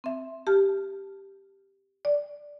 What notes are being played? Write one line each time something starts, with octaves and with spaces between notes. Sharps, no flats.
C4 E5
G4 A5 F6
D5